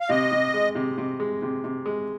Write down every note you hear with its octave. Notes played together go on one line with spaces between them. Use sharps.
F5
C3 D#5
C3
G#3
C3
C3
G#3
C3
C3
G#3